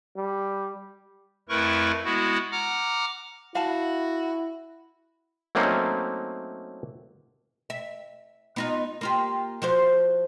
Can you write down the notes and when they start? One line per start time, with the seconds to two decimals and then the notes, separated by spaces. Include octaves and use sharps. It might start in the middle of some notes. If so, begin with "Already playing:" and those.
0.16 G3
1.49 F2 A3 E4 A#4 B4 C#6
2.04 G#3 B3 E4 F#4
2.51 F#5 A#5 D6 F6
3.55 E4 F#4 F5 A5
5.55 F#3 A3 A#3 C4 C#4 D#4
7.70 E5
8.56 B3 D#4 F4
9.01 A#3 F4 G4
9.62 F3 F#4 C5